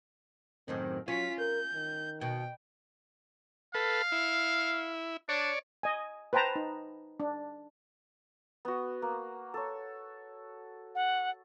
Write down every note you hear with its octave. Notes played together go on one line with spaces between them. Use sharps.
F#2 A2 D#3 C4
F#3 C#4 F4 B6
A#4 G6
D#3
B2 G5
A4 B4 F5
E4
D4 C#5 D5
D#5 G#5
B4 C5 G5 A5 A#5
D#4
D4
B3 F#4
A#3
A4 C#5
F#5